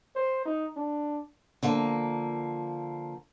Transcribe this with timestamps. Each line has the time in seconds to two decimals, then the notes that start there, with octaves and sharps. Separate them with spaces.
0.15 C5
0.45 D#4
0.76 D4
1.63 D3 F3 A#3